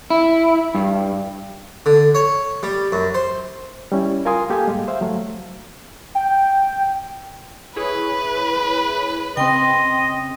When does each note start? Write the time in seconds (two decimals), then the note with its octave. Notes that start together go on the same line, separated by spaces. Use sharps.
0.10 E4
0.75 G2
1.86 D3
2.15 C#5
2.63 G3
2.92 F#2
3.15 C5
3.92 G3 C#4 E4
4.25 F4 A#4 F5 G#5 C6 D#6
4.50 A#3 G4 A4 F5 G#5
4.67 G#2 G3 G#3
4.88 C5 E5 F5
5.01 F#3 A3
6.15 G5
7.76 E4 G#4 B4 C#5
9.37 C#3 C4 D#5 G5 C6